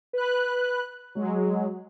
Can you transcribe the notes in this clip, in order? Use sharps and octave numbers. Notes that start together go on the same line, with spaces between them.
B4 F#6
F#3 G#3